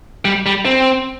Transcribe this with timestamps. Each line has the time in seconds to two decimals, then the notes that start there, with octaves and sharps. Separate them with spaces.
0.25 G3
0.46 G3
0.65 C4